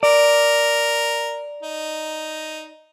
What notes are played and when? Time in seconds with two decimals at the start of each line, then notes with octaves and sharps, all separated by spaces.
0.03 A#4 D5
1.63 D#4